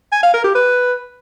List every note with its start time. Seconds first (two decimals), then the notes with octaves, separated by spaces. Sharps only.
0.12 G#5
0.23 F5
0.34 A#4
0.44 G4
0.55 B4